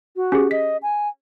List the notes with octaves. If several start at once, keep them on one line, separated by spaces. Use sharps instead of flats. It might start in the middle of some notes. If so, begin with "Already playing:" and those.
F#4
C#4 G4 G#4
D#5 B6
G#5